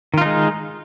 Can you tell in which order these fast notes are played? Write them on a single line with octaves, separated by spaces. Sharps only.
D#3 F4 D#4 G#3